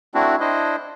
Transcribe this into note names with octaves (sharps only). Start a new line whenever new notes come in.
A3 C4 D4 E4 F#4
D4 E4 C5 D#5